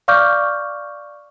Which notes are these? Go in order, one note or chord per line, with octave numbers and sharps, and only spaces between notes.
D5 F5 C#6 D6 F6 G6